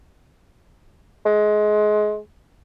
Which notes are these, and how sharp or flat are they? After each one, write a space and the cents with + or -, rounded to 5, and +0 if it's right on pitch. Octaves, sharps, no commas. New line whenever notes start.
G#3 +25